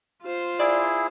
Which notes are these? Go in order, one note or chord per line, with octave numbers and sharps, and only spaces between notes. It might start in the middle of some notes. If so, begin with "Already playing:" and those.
F4 C5
E4 G#4 D5 G#6